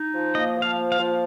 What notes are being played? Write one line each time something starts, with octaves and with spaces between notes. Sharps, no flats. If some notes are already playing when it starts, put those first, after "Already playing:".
Already playing: D#4
F3
A#3 D#5
F3
F5
A#3
F5
F3